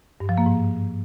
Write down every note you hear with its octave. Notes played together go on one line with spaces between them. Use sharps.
G2
F3
A#3
G#2